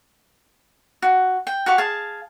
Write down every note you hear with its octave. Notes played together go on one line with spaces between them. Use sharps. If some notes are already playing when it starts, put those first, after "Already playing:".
F#4
G5
F#4 G4 F5 C#6
G#4 F5 A5